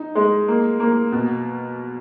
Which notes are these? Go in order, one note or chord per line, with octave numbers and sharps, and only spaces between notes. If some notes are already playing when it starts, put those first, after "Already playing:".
Already playing: D#4
G#3
A#3
A#3
B2